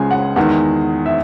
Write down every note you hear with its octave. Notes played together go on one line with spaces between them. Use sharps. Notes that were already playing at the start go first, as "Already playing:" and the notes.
Already playing: C#2 C#3 G#3 G#5
F#5
E2 D#3 G#3 F#5
E5